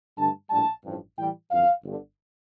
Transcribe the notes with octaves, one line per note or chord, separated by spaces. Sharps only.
G2 D3 A3 A5
A#1 A2 G3 D4 A5
A1 G2 F3
A2 E3 G3 G5
G1 F2 E3 F5
G1 G2 D3